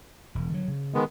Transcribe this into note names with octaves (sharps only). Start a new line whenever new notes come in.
E1
D3 D#3 F#3
C#3
D#3 G#3 B3